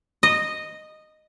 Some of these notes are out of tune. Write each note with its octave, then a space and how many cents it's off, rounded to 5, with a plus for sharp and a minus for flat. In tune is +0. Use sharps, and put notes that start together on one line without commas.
D#5 -10